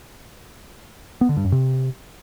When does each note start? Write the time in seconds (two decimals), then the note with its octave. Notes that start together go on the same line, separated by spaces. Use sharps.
1.21 B3
1.29 D3
1.37 G2
1.44 F#2
1.52 C3